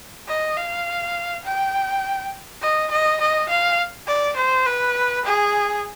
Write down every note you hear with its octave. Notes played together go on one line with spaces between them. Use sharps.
D#5
F5
G5
D#5
D#5
D#5
F5
D5
C5
B4
G#4